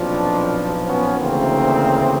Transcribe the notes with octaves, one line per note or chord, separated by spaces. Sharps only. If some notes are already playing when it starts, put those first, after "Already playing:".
Already playing: B1 A#2 F3 C4 D4
B3 C#4
D2 C#3 E3 A#3 C4